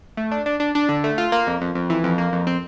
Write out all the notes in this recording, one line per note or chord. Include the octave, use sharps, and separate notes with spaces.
A3
D4
D4
D4
D4
D3
A3
F4
A#3
F2
F2
F2
E3
F2
A#3
F2
C4